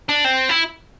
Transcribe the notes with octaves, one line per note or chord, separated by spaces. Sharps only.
D4
C4
E4